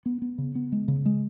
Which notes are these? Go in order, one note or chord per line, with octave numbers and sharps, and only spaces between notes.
B3
B3
C#3
B3
G#3
C#3
G#3